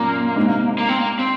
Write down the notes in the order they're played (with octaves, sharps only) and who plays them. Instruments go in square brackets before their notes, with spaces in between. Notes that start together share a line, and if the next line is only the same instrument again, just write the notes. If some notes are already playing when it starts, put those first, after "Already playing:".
Already playing: [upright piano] F#2 A#2 [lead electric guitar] A#3
[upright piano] G#2 C3
[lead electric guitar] A#3
C4
A#3
C4